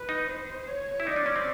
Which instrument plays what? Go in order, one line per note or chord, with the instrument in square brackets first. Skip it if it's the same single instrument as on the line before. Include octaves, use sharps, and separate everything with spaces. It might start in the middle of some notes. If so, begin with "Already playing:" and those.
Already playing: [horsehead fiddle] B4
[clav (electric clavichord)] D#4
[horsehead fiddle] C5
C#5
[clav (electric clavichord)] E4
[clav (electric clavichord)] D#4 [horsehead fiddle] D5
[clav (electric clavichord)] D4
C#4
C4